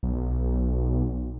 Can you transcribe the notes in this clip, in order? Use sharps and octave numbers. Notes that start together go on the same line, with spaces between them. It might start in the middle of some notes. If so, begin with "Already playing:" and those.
B1